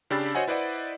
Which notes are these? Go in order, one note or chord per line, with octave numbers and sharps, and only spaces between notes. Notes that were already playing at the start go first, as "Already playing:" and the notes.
C#3 D4 G4 B5 E6 A6
F#4 C5 C#5 D#5 F#5 G#5
E4 B4 C5 D5 D#5 F#5